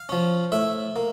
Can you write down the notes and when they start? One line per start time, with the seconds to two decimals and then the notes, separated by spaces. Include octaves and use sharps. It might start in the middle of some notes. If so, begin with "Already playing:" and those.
Already playing: F5
0.09 F3 C#4
0.52 A2 E5
0.96 A#3